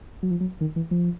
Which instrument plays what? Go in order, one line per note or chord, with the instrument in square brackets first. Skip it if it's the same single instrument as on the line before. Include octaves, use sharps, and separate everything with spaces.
[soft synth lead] F#3
F3
F#3
D#3
E3
F3